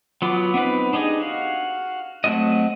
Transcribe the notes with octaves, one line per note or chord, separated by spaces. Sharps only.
F#3 B3 F4 D6
B3 C4 D#4 B4
D4 D#4 G4 G#4 D#5
F#4 F5
F#3 A3 C4 F#4 D#5